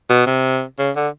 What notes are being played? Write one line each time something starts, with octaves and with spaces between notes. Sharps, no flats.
B2
C3
C#3
D3